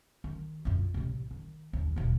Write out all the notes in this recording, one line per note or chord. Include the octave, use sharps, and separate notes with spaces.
D#3
F#2 F4
A1 C3
D#3
D#2
D#1 B1